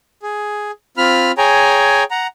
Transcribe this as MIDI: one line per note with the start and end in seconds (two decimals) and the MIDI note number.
0.22 0.71 68
0.97 1.32 60
0.97 1.32 65
0.97 1.32 83
0.97 1.32 89
1.38 2.04 68
1.38 2.04 73
1.38 2.04 79
1.38 2.04 80
1.38 2.04 82
2.11 2.27 78
2.11 2.27 82